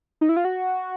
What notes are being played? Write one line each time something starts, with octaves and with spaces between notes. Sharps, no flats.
D#4
E4
F4
F#4